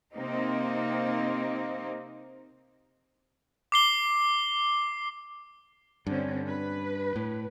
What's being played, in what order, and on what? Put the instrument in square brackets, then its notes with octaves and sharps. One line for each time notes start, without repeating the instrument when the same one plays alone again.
[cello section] C3 A#3 C4 D#4
[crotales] D6 C7 G7
[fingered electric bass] G2 [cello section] D3 C4 C#4
[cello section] B4
[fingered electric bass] A2